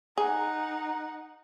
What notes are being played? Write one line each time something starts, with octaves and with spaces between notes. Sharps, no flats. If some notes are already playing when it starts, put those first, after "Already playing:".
D#4 G#4 F#5 A#5